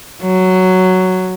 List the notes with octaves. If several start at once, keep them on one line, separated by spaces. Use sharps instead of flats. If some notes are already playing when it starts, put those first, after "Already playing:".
F#3